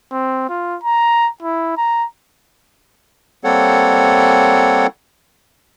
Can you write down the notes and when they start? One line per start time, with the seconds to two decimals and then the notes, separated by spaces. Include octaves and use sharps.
0.12 C4
0.49 F4
0.84 A#5
1.43 E4
1.77 A#5
3.44 G3 A#3 C4 A4 C#5 F#5